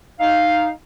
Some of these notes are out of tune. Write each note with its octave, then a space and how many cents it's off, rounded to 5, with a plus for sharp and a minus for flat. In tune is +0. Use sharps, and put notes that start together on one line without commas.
D#4 +0 F5 +0